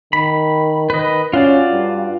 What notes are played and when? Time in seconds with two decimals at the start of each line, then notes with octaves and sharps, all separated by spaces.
0.13 D#3 B5
0.90 D#3 B4 D#5
1.33 C#4 F4 F#4 D5
1.72 G2